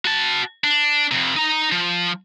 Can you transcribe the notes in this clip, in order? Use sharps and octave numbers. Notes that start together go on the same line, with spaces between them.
F#4 A5
D4
F2 C3
D#4 A#5
F3